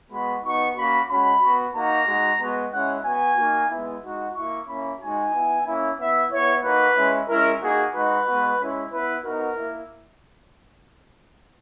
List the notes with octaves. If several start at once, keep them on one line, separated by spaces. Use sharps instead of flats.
G#3 B3 F#4 B5
B3 D#4 F#4 C#6
A#3 C#4 F#4 B5
G#3 C#4 F#4 B5
B3 F#4
A#3 D#4 F#4 A#5
G#3 D#4 F#4
G#3 B3 F#4
G#3 C#4 E4 F#5
B3 F#4 G#5
A#3 D#4 F#4
G#3 B3 E4
G#3 D#4 F#4
A#3 E4 C#6
A#3 C#4 E4 B5
G#3 D#4 F#4 G#5
B3 E4
A#3 C#4 E4
B3 E4 E5
B3 E4 C#5
A#3 D#4 F#4 B4
G#3 C#4 E4
G#3 C#4 E4 A#4
A#3 D#4 F#4 G#4
G#3 D#4 F#4 B4
G#3 B3 F#4
G#3 C#4 E4
B3 E4 B4
B3 D#4 F#4 A#4
A#3 E4